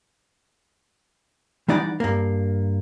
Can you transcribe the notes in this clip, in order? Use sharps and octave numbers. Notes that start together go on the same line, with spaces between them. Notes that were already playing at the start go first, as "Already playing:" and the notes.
E3 G3 D#4 D5 F#5
G2 A#3